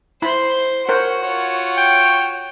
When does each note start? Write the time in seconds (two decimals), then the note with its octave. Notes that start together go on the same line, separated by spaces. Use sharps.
0.22 E4 C5 B5 C6
0.89 F#4 A#4 C5 C#5 F#5
1.23 F4 C#5
1.78 G5